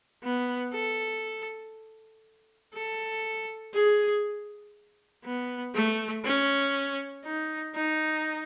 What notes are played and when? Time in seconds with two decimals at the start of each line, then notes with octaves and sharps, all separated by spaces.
0.23 B3
0.73 A4
2.74 A4
3.74 G#4
5.24 B3
5.75 A3
6.24 C#4
7.25 D#4
7.75 D#4